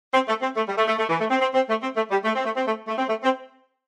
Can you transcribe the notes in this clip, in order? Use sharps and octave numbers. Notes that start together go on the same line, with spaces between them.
C4
A3
C4
A3
G3
A3
A3
A3
E3
A3
C4
C4
C4
A3
C4
A3
G3
A3
C4
A3
C4
A3
A3
C4
A3
C4